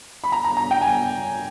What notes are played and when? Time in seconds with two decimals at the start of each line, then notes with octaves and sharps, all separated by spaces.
0.24 B5
0.32 A#5
0.44 A#5
0.57 A#5
0.71 G5
0.81 G#5